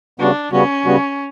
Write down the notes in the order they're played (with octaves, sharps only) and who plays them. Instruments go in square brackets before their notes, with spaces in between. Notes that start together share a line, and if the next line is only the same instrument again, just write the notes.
[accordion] C#3 G3 B3 F#4 [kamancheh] D4
[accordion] C#3 G3 B3 F#4 [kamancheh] C#4
[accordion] C#3 G3 B3 F#4